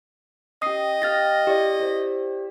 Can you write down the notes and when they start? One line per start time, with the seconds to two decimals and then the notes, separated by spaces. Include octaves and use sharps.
0.62 C#4 G4 D#5 D#6 C7
1.02 G4 F5 F6 A6 A#6
1.47 E4 G4 D5
1.80 C5 B5